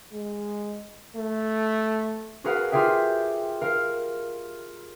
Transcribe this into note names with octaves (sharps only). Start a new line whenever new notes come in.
G#3
A3
F#4 G#4 A#4 B4 F5 F#5
F4 G4 G#4 E5 G5
A#4 F5